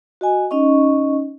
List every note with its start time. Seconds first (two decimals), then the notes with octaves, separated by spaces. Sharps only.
0.21 F#4 D#5 G#5
0.51 C#4 D#4 D#5 C#6